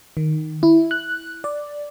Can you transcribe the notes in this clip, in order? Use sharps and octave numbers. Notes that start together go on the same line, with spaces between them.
D#3
E4
F#6
D5